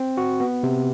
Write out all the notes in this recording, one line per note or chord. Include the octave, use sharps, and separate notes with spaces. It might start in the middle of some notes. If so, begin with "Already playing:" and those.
Already playing: C4
F#4
B3
C3